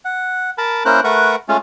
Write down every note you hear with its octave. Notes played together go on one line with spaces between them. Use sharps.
F#5
A#4 A5 B5
A#3 C#4 E4 A#4 C5 F#6
A3 A#4 B4 F#5 C#6
G#3 A3 C#4 F4